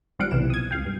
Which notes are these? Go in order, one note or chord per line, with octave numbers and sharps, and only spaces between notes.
G#1 F3 G3 F5 F#5 D7
B1 C3 E3 E7
D#6 G#6
C#2 F5 G5
G2